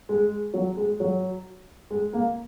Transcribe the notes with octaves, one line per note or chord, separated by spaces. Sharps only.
G#3
F#3
G#3
F#3
G#3
A#3